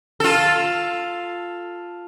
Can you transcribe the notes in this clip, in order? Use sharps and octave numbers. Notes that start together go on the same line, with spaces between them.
F4 A4